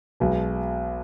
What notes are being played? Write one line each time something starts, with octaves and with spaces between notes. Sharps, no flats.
B1 B2 G#3